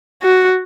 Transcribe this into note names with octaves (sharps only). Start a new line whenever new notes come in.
F#4